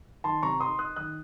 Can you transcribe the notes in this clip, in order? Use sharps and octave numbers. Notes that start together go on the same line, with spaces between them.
D#3 A5 C6
C3 A#5 C#6
D#4 C6 D#6
D#4 D#6 F#6
D#3 D#6 F#6